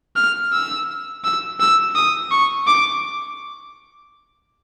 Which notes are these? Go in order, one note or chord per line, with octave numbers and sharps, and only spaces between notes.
F6
E6
E6
E6
D#6
C#6
D6